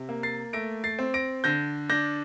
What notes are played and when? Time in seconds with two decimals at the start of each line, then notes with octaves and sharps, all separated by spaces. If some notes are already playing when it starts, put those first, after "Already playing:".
Already playing: C3
0.09 A#3
0.23 A6 C7
0.53 A3 A#6 D7
0.84 A6 C7
0.99 C4
1.14 A#6 D7
1.44 D3 G6 A#6
1.89 D4 G6 A#6